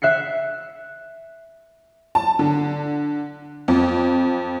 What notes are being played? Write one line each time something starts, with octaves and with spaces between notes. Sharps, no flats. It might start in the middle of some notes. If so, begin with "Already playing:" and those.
E5 F#6 C7 C#7
A5
D3
F2